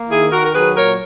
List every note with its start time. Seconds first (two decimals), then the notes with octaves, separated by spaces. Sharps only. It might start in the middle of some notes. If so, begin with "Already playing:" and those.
Already playing: A#3
0.09 D#3 E4 G#4
0.31 D#3 F#4 A#4
0.44 A#4
0.54 F#3 G#4 B4
0.76 A#2 A#4 C#5